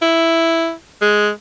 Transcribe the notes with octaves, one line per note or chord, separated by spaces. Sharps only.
E4
G#3